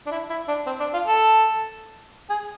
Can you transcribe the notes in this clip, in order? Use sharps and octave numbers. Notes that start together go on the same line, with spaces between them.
D4
E4
E4
D4
C4
D4
F4
A4
G#4